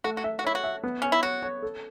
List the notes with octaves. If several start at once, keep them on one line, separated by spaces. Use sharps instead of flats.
A3 F#4
F#4
E5
F#4
E4 C#5
F#4
E5
B3
C#4 C#5
E4
F#4 C#5
C#5
A4